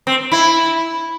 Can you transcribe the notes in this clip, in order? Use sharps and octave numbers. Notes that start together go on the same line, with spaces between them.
C4
E4